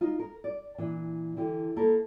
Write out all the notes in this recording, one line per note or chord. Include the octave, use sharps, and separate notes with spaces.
D#4 F4
A#4
D5
A#2 E3 D4
D3 E3 G4
A#3 E4 A4 A#4